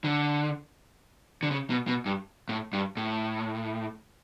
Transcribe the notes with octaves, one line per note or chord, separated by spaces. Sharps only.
D3
D3
C#3
B2
B2
G2
A2
G2
A2